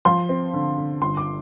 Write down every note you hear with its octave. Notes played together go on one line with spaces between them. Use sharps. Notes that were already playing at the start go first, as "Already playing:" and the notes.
F3 C6
C4
D3
D3
G1 C6
D6